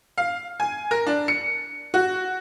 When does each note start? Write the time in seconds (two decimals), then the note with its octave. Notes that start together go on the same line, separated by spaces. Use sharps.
0.18 F5
0.60 G#5
0.91 A#4
1.07 D4
1.28 C#7
1.94 F#4